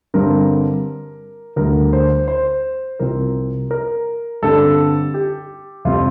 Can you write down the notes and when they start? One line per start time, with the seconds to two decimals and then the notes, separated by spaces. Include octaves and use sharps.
0.14 G2 D3 G3 C4 A#4
1.56 D2 D3 G3 A#4
1.93 C5
2.28 C5
3.00 C2 C3 F3 C4 A#4
3.71 A#4
4.42 G2 D3 G3 C4 A4
5.14 G4
5.85 F2 C3 G3 C4 F4